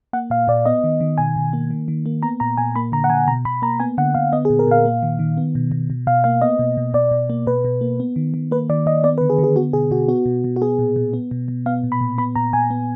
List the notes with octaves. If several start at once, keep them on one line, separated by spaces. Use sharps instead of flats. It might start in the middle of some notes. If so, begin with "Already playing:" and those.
A#3 F#5
A#2 F5
A#2 D5
B3 D#5
D#3
D#3
B2 G#5
B2
A#3
D#3
D#3
A#3
B3 A#5
A#2 A#5
A#2 G#5
A#3 B5
D3 A#5
F#5
D3 G#5
B2 A#5
B2 B5
A#3 A#5
B3 G#5
D3 F#5
D3 F5
B3 D#5
G#4
A#2
A#4
A#2 F5
A#3
D#3
D#3
B3
B2
B2
B2
B2 F5
A#3 F5
B3 D#5
B2
B2
B2 D5
B2
A#3
B2 B4
B2
A#3
B3
D#3
D#3
A#3 B4
D#3 D5
D#3 D#5
B3 D5
B4
D3
G#4
D3
G#4
B3 F#4
B2 G#4
B2 F#4
B3 F#4
B2
B2
F#4
B3 G#4
A#2
A#2
B3
B2
B2
B3 F5
A#2
B5
A#2
B3 B5
A#2 A#5
A#2 G#5
B3